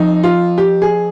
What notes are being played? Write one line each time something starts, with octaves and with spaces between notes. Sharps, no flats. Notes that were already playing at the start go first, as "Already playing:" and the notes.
Already playing: F2 D#4
F4
G4
G#4